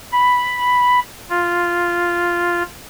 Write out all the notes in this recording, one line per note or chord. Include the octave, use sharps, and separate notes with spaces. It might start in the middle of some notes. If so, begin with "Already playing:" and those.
B5
F4